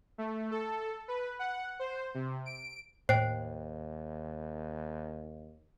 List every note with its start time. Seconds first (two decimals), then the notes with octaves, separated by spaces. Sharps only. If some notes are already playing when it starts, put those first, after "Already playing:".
0.18 A3
0.51 A4
1.08 B4
1.39 F#5
1.79 C5
2.15 C3
2.46 D7
3.09 D#2 A2 C5 G5 C7